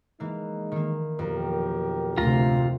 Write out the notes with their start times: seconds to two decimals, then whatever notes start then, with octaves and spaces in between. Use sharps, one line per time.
0.20 E3 G#3 A#3 D#4
0.72 D#3 A#3
1.19 B1 F2 G4 A#4
2.18 D2 C3 F4 A#5